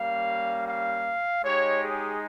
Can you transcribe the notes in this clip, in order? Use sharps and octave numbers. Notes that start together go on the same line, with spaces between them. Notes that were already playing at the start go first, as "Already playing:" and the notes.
Already playing: G3 A#3 C#4 F5
F5
G#3 D#4 G4 C#5
G#4